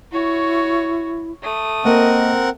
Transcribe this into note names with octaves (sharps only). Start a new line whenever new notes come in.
E4 F#4 C#5
A3 D#6
A#3 C4 A#4 D#5 F#5